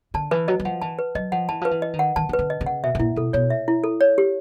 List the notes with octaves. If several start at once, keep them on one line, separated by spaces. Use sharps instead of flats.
D3 A5
E3 B4
F#3 D#5
F#3
F3 F#5
E3 A5
B4
F#3 D#5
F3 F#5
E3 A5
F3 B4
E3
D#5
D#3
F#5
D#3 A5
D#3
B4
D3
D#5
C#3
F#5
B2 E5
B2
A#2 E4
B2 A4
B2 C#5
E5
E4
A4
C#5
G4